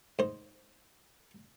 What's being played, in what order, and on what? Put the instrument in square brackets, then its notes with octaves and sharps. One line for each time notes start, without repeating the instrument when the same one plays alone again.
[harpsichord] G#2 C5